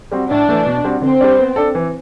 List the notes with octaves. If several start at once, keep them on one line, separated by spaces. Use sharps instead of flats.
G3 C4 F#4
A2 D4
E3 A3
B2
G3 C4 F#4
D3 C4
G3 D4
B3
D4 A4
E3